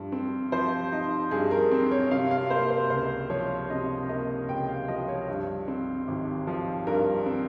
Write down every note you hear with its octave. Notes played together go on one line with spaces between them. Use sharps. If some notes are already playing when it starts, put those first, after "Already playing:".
Already playing: G2 F3
C4
F3 C5
D#4
G2 G#4
A#4
C4
C#5
C3 F5
F5
A#3 C5
C5
C#2 C5
F3 C#5
C3 D#5
A#3 D#5
C#2 G5
F5
F3 D#5
C#5
G2
C4
G#1
F3
G2 A#4
C4